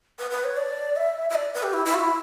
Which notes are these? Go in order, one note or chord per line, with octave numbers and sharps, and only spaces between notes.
B4
B4
C#5
D5
E5
E5
D5
B4
G4
E4
E4
F#4
E4